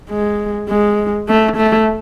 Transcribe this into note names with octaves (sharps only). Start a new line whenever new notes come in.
G#3
G#3
A3
A3